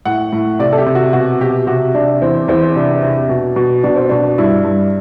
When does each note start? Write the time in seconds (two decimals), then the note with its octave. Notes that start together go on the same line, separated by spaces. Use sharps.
0.05 A2 F#5
0.33 A2
0.59 C3 D5
0.72 A4
0.78 G4
0.86 C3
0.95 F#4
1.13 B2 F#4
1.41 B2 G4
1.67 C3 F#4
1.95 C3 D4
2.22 E2 C4
2.48 E2 C4
2.76 C3 D4
3.03 C3
3.29 B2
3.56 B2
3.83 B2 D4
3.96 C4
4.09 B2 D4
4.38 G2 E4
4.64 G2